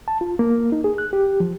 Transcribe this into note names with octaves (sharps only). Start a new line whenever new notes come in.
A5
F4
A#3
D#4
G#4
F#6
G4
F3